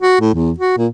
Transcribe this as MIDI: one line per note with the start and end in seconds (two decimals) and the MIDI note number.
0.02 0.17 66
0.20 0.33 45
0.34 0.51 40
0.58 0.76 66
0.77 0.87 46